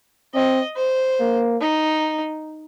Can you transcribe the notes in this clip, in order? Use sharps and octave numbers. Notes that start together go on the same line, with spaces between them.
C4 D#5
C5
A#3
D#4